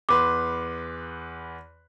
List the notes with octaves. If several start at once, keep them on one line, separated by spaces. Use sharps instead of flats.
E2 B4 C6 D6